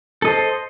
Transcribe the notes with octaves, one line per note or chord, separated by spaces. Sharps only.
A4 C5 D#5